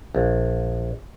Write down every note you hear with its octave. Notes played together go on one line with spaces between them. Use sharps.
A#1